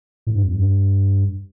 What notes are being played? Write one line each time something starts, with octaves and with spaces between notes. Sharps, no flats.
A2
G2
F2
G2